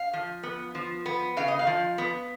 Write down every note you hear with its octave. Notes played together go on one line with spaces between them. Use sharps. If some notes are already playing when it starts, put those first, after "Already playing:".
Already playing: F5
F3
B3
F3
B3
C#3 F5
D#5
F5
F3
B3